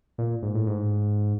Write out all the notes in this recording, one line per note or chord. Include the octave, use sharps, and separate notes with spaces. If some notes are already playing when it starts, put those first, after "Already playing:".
A#2
G#2
A2
G#2